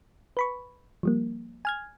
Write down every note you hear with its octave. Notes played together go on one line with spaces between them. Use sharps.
B4 B5 C#6
F3 G3 A#3
G#5 F6 G#6